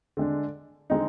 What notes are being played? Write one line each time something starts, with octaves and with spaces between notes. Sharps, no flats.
D3 G#3 D4
D3 G#3 C4 D#4